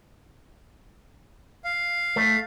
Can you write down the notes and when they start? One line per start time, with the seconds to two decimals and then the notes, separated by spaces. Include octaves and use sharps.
1.65 F5
2.16 A3